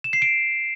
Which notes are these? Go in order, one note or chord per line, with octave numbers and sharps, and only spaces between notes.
E7
C7
D7